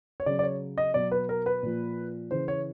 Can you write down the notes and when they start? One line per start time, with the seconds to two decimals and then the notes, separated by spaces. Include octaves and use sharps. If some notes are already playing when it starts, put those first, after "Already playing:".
0.20 C#5
0.26 C#3 F#3 D5
0.39 D5
0.43 C#5
0.78 D#5
0.94 B2 F#3 D5
1.11 B4
1.29 A#4
1.46 B4
1.63 A#2 F3
2.31 C#3 E3 C5
2.48 C#5